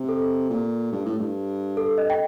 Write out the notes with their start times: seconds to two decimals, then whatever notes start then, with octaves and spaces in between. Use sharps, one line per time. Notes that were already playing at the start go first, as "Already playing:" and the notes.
Already playing: C3
0.08 A4
0.50 A#2
0.92 G2
1.05 A2
1.19 G2
1.77 A4
1.98 D#5
2.10 G5